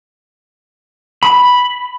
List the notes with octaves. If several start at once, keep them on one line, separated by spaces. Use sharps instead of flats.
B5